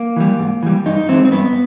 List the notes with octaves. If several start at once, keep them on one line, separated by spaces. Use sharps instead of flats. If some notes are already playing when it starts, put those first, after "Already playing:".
Already playing: A#3
E3 G3
G#2
E3 G3
G2 D#4
E3 G#3 C4
C4
G2 B3